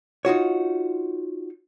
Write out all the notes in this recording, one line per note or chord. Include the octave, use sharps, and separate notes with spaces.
D#4 F4 F#4 C#5